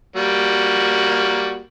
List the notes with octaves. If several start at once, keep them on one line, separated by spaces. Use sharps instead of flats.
G3 A#3 F#4